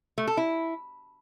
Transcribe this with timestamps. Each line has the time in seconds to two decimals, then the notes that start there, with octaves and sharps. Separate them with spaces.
0.18 A3
0.27 A4
0.37 E4